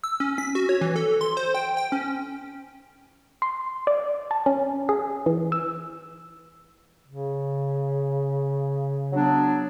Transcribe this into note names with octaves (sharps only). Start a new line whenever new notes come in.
E6
C#4
B6
F#4
C#5
E3
A4
C6
C5
G5
G5
C#4
C6
D5
A5
C#4
G#4
E3
E6
C#3
F#3 B3 D4